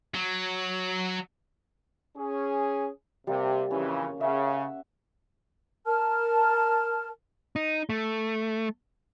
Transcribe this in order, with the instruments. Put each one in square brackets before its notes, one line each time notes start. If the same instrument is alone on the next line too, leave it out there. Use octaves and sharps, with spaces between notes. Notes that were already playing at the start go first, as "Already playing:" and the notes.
[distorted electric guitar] F#3
[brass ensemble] C#4 G#4
[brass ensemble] C3 [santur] G3 A#3
[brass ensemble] F2 C#3 E3 [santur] C#4
[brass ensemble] C#3 [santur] E5 F#5
[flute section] A#4 A5 F6
[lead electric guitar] D#4
A3